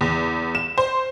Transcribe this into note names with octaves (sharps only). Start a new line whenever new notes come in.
E2
E7
C5